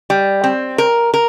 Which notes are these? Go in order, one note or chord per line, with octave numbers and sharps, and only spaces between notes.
G3
C4
A#4
A#4